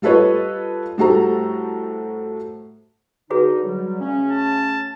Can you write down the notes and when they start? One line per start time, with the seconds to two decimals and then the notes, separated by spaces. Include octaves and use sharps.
0.02 G3 F4 A4 B4 C#5 D#5
0.98 A2 G3 F#4 A4 C5 A#5
3.30 D3 D#4 F#4 G#4 B4
3.64 F#3 G3
4.00 C#3 A3 C#4
4.31 A5